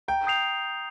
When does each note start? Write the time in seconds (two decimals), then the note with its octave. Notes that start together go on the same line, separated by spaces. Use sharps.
0.08 G5 A#5
0.27 D#6 G6 C7 F7